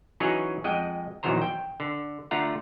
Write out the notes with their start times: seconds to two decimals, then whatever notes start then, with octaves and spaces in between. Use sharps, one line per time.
0.20 E3 F#3 C#4 D#4 G#4 C#5
0.64 F2 G#3 D#5 F#5 G5
1.23 A#1 E2 D#3 F#3 C5 A#5
1.42 G5
1.80 D3
2.31 D3 A3 F4 F#5 A#5